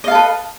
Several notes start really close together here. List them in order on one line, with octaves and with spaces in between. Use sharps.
D#5 F5 A4 B4